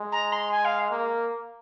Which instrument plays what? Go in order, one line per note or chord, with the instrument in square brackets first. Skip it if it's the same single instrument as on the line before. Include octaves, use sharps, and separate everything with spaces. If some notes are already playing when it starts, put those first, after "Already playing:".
Already playing: [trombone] G#3
[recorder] A#5
C6
G#5
F5
[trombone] A#3